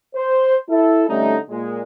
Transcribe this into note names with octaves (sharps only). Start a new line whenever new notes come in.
C5
E4 A4
D3 G3 A3 C#4 D#4
A#2 G#3